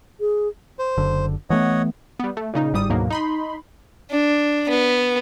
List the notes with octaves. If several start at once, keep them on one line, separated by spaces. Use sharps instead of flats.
G#4
C5
F#1 D3
E3 A3 B3 C#5 D#5 F#5
G3 B3
A3
A#2 C#3 D#4
G1 G#2 G3 D#6
D2 G#2 B2 F#3 A#3
D#4 B5 C6
D4
B3